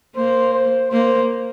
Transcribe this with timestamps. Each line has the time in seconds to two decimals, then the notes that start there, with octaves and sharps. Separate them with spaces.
0.16 A#3 C5
0.53 C5
0.91 A#3 C5